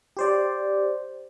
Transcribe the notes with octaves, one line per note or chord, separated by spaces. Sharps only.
G4 C5 D5